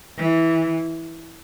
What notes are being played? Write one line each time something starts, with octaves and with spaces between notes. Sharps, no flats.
E3